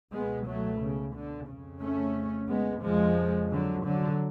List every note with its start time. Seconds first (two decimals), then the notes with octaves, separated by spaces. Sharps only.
0.13 C#2 B2 G#3 B3
0.47 F#3 A3
0.82 C#3
1.16 D3
1.49 F2 C#3
1.83 A3 C#4
2.50 G#3 B3
2.84 F2 C#3 F3 G#3
3.52 D3 F#3
3.86 D3 F#3